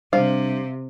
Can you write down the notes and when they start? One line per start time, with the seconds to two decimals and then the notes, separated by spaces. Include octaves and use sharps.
0.13 C3 G3 D4 C5 F5